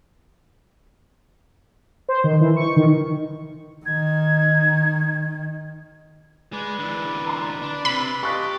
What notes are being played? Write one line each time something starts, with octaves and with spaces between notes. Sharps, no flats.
C5
D#3
E3
C#6
D#3
D#3 G#6
G#3 B4 D5
D3 E3
A#5 C6
D4
C3 B5
F4 G4 D#5 A5 C#6 F#6 B6